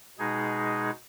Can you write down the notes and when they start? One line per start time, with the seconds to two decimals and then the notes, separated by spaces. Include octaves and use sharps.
0.19 B2 G#3 D#4 G#4